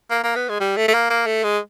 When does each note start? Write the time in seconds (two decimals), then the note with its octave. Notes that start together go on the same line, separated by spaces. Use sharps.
0.11 A#3
0.24 A#3
0.36 B3
0.49 G#3
0.60 G3
0.77 A3
0.88 A3
0.94 A#3
1.10 A#3
1.27 A3
1.44 G#3